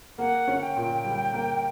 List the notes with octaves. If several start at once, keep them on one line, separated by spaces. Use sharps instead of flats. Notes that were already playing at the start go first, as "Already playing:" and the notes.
A#3 F#5
C#4
G5
A#2
G3
A#3